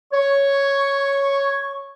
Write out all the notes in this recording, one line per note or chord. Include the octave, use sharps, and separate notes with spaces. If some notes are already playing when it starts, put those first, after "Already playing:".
C#5 C#6